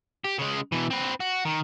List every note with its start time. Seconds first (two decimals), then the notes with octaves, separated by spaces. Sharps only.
0.24 G4
0.39 C#3 G#3
0.72 B2 E3
0.90 C4 B4
1.20 F#4
1.45 D#3